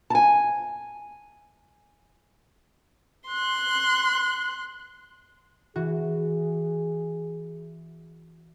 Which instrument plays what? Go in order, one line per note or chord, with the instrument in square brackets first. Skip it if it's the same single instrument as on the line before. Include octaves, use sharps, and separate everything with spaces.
[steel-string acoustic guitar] G#5 A5
[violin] C6 F#6
[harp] E3 F#4 [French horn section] G#4